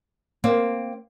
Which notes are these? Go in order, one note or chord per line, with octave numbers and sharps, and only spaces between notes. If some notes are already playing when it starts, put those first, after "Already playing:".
A#3 C4